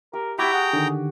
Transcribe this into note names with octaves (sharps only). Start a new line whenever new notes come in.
G4 A#4
E4 F#4 G4 G5 A#5 B5 D6 G#6
G#4 F#5
D3 D#3